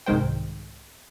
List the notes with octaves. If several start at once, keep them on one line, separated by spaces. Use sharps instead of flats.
C2 G#2 D#3 G#3 C5 G5